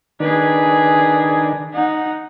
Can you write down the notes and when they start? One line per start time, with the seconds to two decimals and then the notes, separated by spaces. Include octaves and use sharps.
0.20 D#3 D4 G#4 B4
1.73 D#4 F#5